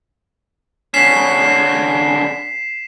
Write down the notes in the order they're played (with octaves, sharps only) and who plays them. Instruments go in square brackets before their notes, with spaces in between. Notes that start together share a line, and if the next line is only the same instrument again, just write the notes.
[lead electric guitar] D3 C#4 [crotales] B6 C7 E7